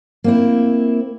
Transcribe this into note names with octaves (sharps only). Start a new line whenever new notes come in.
A#3 C4 E4